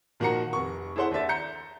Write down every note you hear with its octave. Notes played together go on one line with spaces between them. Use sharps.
A#2 D#3 F3 F#4 A#5 C#7
F1 C#6
E4 G#4 A4 C5 F#5
D#2 D4 E5 A6
A#5 G6 C#7